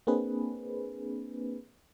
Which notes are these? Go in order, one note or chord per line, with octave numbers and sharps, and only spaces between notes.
A#3 C4 D4 G#4 B4